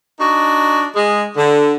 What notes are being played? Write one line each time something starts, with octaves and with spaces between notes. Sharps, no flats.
D4 D#4 F#4
G#3
D3